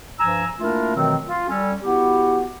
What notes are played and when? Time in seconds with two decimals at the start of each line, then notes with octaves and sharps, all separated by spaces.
0.19 G2 F3 G#5 A#5 E6
0.59 A3 A#3 D4 E4 F4 A#4
0.95 B2 D#3 E3 F#3 A3 C4
1.27 F4
1.48 G3 C#4 A4
1.82 B3 E4 F#4 G4